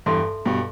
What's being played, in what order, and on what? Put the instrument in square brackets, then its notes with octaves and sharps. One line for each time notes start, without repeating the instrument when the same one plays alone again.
[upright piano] E2 G2 [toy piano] A4 E5 A5 C6
[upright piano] G2 B2